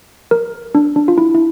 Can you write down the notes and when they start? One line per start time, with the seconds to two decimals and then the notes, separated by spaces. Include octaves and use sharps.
0.31 A#4
0.75 D4
0.96 D4
1.08 F4
1.18 E4
1.35 E4